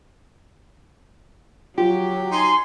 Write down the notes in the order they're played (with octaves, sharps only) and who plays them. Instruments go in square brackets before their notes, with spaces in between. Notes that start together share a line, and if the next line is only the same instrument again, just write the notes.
[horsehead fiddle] F#3 [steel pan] F4 [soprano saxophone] G4
[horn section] D#4 G#5 C6